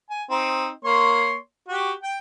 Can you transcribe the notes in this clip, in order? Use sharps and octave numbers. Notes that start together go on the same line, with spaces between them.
G#5
C4 D#4
A#3 C#5 C6
F#4 G4
G5